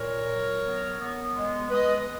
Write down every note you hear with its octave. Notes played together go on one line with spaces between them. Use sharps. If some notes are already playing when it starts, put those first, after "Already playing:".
Already playing: A#2 A#4 C#5
F#3
B3
B3
G#3
G#3 B4 D#5